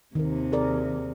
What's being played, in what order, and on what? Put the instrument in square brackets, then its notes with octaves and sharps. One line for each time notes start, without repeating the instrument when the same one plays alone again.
[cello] D#2 C3 [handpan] D#3 A#4
[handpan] G#4 A#4 D5